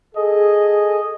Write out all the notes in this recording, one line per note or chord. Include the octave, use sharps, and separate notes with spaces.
G#4 A4 D#5